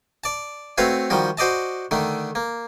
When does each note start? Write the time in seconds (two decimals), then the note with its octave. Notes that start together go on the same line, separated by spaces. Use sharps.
0.24 D5 A5
0.78 A3 C4 F#4 B4 C#5 F5
1.10 D#3 F3 G3 F#4
1.37 F#4 C5 D5 D#5 A5
1.91 D3 D#3 A3
2.35 A#3